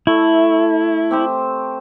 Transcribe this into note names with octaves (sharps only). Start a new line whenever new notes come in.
A3 E4
C4 G4 C5